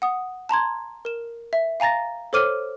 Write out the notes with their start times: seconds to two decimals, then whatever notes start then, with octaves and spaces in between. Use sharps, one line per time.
0.02 F#5 D#6
0.49 A5 A#5 C6 G#6
1.05 A#4 E7
1.53 E5
1.80 F5 G#5 A#5 A6 A#6
2.33 A4 C5 C#5 D6 F6 D#7